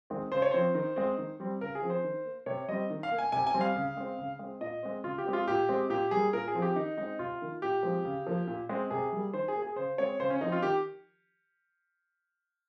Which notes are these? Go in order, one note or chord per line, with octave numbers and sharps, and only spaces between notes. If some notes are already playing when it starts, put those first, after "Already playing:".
D#3 G#3 C4
C#3 C5
C#5
F3 C4 C5
D#3
G#3 C4
D#3
G3 C4
C#3 A#4
G#4
F3 C4
C5
D#3
A#3
C3 C#5
G3 C4 D#5
D#3
F5
A#3
G#5
C3 G#5
G#5
G3 C4
F5
C#3
G#3 C4
C#3
G#3 C4
A#2 D#5
G#3 C4
C#3 F4
G4
G#3 C4
F4
A#2 G4
G#3 C4
A#2 G4
G3 A#3 G#4
A#2 A#4
G#4
F3 C4
G4
D#3 D#4
G#3 C4 D#4
C3 F4
D#3 A#3
A#2 G4
F3 G#3 C4
C#3
F3 A#3
A#2
G#3 C4
C3 G#4
G3 A#3
D#3 C5
G#4
A#3
G#4
C#3 C5
G#3 C4 C#5
C#3 C5
C#4
F3 C4 D#4
F4
D#3 G4